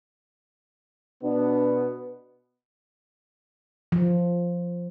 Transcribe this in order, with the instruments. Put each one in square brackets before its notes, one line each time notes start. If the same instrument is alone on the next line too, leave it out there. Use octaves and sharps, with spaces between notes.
[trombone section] B2 B3 [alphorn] D4
[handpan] F3